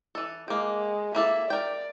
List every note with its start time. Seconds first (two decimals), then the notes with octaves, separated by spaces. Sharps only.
0.15 E3 A4
0.48 G#3 A#3 G5
1.15 A#3 E4 A4 E5
1.50 A#4 D5 G5